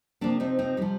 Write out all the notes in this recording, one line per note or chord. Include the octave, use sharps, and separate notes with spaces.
C3 F3 A#3 D4
C4 D#4
C4 D#4
C3 F3 G3